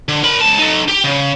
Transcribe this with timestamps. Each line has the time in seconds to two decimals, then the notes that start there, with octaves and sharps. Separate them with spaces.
0.09 D3
0.24 A#4 B5
0.42 C#2 A5
0.59 D#4 A4
0.88 G4
1.04 C#3